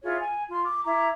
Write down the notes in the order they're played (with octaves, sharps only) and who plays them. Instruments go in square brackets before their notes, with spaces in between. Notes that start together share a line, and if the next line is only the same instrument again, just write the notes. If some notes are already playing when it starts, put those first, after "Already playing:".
[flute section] E4 F4 G#4 C#5
G#5
F4 C6
D6
E4 A#5 D6